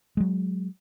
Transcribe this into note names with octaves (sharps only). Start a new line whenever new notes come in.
F#3 G#3